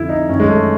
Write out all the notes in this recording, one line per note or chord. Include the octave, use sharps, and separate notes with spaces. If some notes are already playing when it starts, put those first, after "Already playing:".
Already playing: F2 D3 E4
D#4
F#2 D#3 C#4
G#3
A3